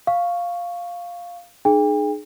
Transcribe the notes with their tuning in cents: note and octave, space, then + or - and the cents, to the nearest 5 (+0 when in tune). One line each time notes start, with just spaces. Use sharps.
F5 +0 C#6 +0
D#4 -45 G#4 +20 G5 +40